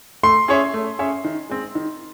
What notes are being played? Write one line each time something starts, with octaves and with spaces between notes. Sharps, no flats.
A3 C6
C#4 G#4 C#5 E5
A3
C#4 G#4 C#5 E5
D#3
G#3 C4
D#3